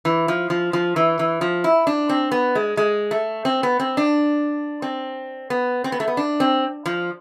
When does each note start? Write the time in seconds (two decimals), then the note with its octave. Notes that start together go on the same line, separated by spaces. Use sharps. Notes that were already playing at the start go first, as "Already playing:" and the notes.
0.05 E3
0.28 F3
0.50 F3
0.73 F3
0.96 E3
1.19 E3
1.41 F3
1.64 E4
1.87 D4
2.09 C4
2.32 B3
2.55 G#3
2.77 G#3
3.11 A3
3.45 C4
3.63 B3
3.80 C4
3.97 D4
4.82 C4
5.50 B3
5.84 C4
5.92 B3
6.00 A3
6.08 B3
6.17 D4
6.40 C4
6.86 F3